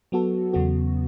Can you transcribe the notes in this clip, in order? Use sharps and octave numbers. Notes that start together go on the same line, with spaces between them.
F#3 B3 F#4 A4
E2 C#3 F#3 B3 F#4